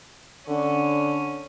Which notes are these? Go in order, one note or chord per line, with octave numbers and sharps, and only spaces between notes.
D3 C#4